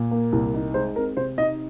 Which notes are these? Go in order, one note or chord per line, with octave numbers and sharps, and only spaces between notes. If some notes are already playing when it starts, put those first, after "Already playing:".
Already playing: A#2
A#3
C2
D#4
G#3 C5
C4 A#4
C3 C5
D#4 D#5